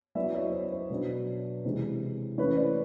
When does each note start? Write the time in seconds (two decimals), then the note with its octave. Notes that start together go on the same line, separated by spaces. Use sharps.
0.15 F#3 B3 E4 D5 E5
0.34 C#5 D#5
0.52 C5
0.72 C5
0.90 B2 F#3 B3 D4
1.65 C3 E3 G#3 C5
2.38 E3 A3 C#4 E4 B4 C#5
2.56 C5 D5